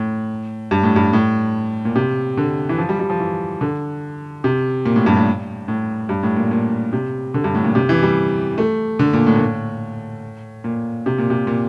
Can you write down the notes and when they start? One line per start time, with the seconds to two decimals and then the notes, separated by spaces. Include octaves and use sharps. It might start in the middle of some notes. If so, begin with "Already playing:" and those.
Already playing: A2
0.71 G2
0.83 A2
0.96 G2
1.13 A2
1.85 A#2
1.95 C3
2.37 D3
2.69 E3
2.78 F3
2.89 G3
2.99 G3
3.10 F3
3.20 E3
3.61 D3
4.44 C3
4.86 A#2
4.96 A2
5.06 G2
5.16 A2
5.68 A2
6.09 G2
6.23 A2
6.37 A#2
6.51 A#2
6.93 C3
7.34 D3
7.44 G2
7.55 A2
7.64 A#2
7.75 C3
7.89 E3
8.03 G3
8.58 A3
8.99 D3
9.13 A#2
9.27 A2
9.36 A#2
9.40 A2
10.64 A#2
11.06 C3
11.18 A#2
11.30 C3
11.47 A#2